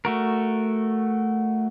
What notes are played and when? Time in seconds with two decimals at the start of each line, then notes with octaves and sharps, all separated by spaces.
0.05 A3 F#4 A#4